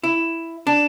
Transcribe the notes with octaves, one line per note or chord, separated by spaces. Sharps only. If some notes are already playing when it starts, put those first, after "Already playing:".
E4
D4